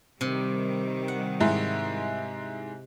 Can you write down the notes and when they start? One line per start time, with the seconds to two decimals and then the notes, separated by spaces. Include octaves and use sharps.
0.21 C3 D#3 G3
1.08 F#5
1.40 G#2 G#3 E4